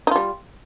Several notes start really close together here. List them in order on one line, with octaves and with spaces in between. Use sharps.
D#4 F4 G3